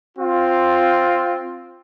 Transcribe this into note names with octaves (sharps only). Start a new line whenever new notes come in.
C4 F4